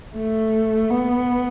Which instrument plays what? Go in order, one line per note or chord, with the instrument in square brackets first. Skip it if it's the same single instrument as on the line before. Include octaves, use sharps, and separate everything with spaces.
[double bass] A3
B3